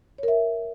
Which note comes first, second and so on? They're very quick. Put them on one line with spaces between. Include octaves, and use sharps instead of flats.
C#5 A#4 E5